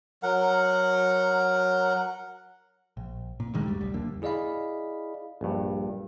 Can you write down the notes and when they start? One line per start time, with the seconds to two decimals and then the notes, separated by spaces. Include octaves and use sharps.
0.23 F#3 A#4 F#5
2.97 A#1
3.40 A#2
3.54 D#1 D2 D#3 G#3
3.66 D2 G2 G3
3.81 D#1 B1 G3
3.93 E1 F2 D3 A#3
4.22 E4 G#4 D5 D#5 F5 B5
5.41 A#1 G2